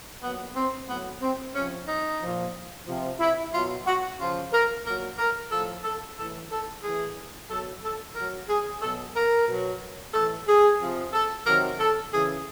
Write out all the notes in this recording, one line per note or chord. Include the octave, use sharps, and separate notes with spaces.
A#2 F#3 B3
C4
A2 F#3 B3
C4
C3 F3 C#4
D#4
A#2 F3
C3 F3
E4
B2 F#3 F4
F#4
C#3 F3 F4
A#4
A#2 F#3 A#4
A#4
A2 F3 A4
A4
A2 E3 A4
A4
A2 E3 G#4
B2 F#3 A4
A4
A2 F#3 A#4
G#4
B2 F#3 A4
A#4
B2 F#3
A2 E3 A4
G#4
C3 F3
A4
C3 D#3 F#3 A#4
A4
C#3 E3 G#4